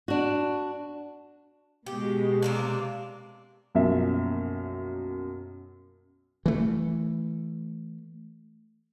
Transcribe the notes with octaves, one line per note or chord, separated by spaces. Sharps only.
D4 F#4
B2 G#3 G4
C3 A#3 D4
B1 F#2 F3 A#3 E5
E3 A3